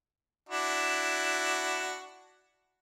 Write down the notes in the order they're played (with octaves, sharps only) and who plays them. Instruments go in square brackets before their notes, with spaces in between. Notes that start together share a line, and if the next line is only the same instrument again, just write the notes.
[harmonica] D4 E4 F#4